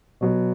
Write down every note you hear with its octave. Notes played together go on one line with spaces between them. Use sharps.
B2 F#3 B3